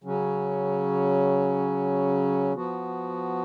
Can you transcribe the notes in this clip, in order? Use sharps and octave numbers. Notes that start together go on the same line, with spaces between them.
C#3 F#3 C#4
F3 B3 F#4